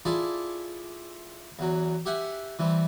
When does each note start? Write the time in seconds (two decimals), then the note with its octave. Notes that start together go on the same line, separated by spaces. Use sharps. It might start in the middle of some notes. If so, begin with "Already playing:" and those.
0.05 E4 F4 G#4 A4 D5
1.59 E2 F#3
2.06 G4 E5 F#5 G#5
2.59 E3 G3 C4